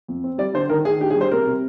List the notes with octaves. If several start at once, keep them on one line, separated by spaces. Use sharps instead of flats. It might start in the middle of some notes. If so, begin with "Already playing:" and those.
F2
C4
G3 D5
D3 C5
D#3 A#4
D#3 G#4
D4 G4
G#4
G3
C5
C3 A#4
C3